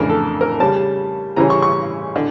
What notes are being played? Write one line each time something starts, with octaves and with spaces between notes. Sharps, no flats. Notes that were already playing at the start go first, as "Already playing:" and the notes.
Already playing: F2 C#3 E3 A3 D4 A#4
A4
A#4
C#3 G3 C#4 A5
C#3 E3 G3 C#4 A#5
C#6
C#6
D3